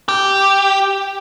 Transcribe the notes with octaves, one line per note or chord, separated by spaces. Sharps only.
G4